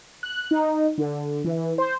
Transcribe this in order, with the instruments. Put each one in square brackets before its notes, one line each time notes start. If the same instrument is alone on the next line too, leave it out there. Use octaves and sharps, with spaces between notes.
[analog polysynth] F#6
D#4
D3
E3
C5